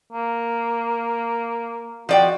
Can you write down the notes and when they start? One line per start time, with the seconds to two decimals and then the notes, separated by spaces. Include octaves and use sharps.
0.13 A#3
2.09 F3 F#4 D5 G5